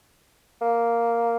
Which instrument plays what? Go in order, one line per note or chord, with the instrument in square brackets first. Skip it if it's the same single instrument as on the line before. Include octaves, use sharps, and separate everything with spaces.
[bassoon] A#3